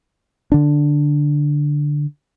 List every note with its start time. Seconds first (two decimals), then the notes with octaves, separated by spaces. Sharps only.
0.52 D3 D4